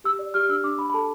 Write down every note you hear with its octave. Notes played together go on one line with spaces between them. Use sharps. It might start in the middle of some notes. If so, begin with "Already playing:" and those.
G4 E6
D5
G4 F6
D4 E6
D4 D6
D4 B5
B5
A4 A5